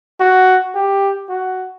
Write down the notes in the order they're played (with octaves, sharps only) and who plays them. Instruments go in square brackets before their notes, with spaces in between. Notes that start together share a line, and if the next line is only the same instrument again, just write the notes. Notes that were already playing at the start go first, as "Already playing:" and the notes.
[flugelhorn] F#4
G4
F#4